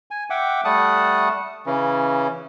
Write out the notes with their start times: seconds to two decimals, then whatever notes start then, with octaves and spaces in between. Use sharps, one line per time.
0.11 G#5
0.30 E5 F#5 G5 D6
0.65 G3 A3 F#5 A5 D#6 F#6
1.66 C#3 E3 C#4